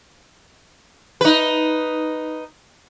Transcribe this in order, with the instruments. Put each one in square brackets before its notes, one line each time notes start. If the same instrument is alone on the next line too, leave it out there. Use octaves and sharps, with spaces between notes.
[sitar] D#4 B4